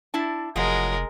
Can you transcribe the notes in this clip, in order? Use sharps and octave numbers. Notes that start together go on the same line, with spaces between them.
D4 E4 A5
F1 F3 F#3 G#3 A#4